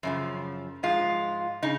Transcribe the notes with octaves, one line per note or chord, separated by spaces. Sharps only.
F#2 C#3 F3
G#2 F3 G#3 F4
C#3 D#4